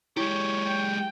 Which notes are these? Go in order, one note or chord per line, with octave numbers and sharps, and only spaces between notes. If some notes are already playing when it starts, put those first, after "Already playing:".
G#3 E4 G4 C#5
G5